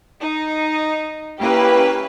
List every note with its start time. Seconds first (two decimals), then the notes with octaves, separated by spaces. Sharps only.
0.21 D#4
1.40 A#3 C#4 E4 G4 B4